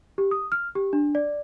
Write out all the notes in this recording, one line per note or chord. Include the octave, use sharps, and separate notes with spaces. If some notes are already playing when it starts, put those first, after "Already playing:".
G4
D#6
F6
G4
D4
D5